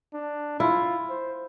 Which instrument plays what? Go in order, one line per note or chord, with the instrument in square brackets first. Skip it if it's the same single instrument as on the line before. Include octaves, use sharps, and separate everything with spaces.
[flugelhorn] D4
[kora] E4 [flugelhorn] F4
[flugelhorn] C5